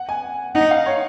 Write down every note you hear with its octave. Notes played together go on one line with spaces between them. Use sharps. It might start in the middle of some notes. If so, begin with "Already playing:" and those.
Already playing: F#5
G#5
D#4 F#5
F5
C#5